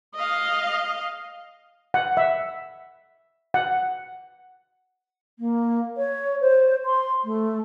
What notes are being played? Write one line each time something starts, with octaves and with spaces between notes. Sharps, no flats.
D#5 F5
F#5
E5
F#5
A#3
C#5
C5
C6
A3